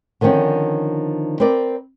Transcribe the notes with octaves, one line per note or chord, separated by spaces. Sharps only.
D3 D#3 F3 C4 C#4
C4 A#4 B4 D5